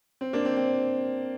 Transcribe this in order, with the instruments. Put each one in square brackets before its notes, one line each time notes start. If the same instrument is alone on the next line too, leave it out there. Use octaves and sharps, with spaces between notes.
[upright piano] C4
A#3 D4
C4
C4